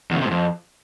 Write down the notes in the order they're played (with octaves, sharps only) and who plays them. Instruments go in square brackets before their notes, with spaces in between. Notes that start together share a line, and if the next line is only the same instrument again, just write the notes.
[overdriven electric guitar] E2
C#3
C3
G#2
F2